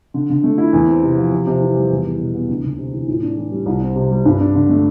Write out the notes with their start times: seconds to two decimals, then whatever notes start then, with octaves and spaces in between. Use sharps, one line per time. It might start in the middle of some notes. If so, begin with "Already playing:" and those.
0.14 D3
0.30 D3
0.44 A3
0.58 E4
0.73 E2
0.87 C4
1.03 C3
1.17 F3
1.32 C3
1.47 C3
1.61 E3
1.76 G3
1.90 E2
2.05 E2
2.19 B2
2.34 B3
2.49 D2
2.64 D2
2.78 C3
2.93 E3
3.08 A2
3.23 D4
3.37 E3
3.52 G3
3.66 C2
3.81 C4
3.96 C3
4.11 G3
4.25 G2
4.40 D4
4.54 D3
4.69 A3